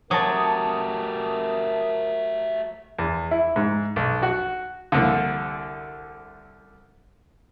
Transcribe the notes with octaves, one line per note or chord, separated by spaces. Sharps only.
F#3 A3 G4 A#4 A5 D#6
E2
E4
G#2
B1
F#4
C2 D3